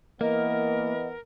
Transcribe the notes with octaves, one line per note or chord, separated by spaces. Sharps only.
E3 A#3 B3 A#4 D#5